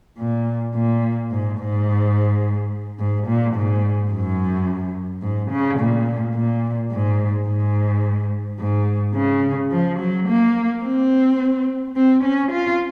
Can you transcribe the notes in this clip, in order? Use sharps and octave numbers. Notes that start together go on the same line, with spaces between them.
A#2
A#2
G#2
G#2
G#2
A#2
G#2
F#2
G#2
C#3
A#2
A#2
G#2
G#2
G#2
C#3
F3
F#3
A#3
C4
C4
C#4
F4